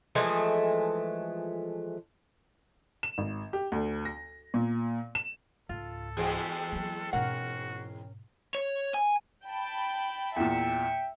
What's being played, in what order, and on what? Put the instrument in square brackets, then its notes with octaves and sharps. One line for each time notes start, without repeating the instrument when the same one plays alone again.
[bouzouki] E3 F3 G#3 A3
[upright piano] E7
G#1
G4
D2
A#6
A#2
E7
[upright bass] C#2 G#2 [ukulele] F4 [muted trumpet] A4
[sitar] E2 G#3 C4 [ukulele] F#4 G#4
[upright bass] F#3 A#3
[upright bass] G#2 B2 [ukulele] C#4 A#4 F#5 [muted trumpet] F#4
[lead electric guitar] C#5
G#5
[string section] G5 A5 B5
[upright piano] E2 A#2 [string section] E5 C#7 [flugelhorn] G5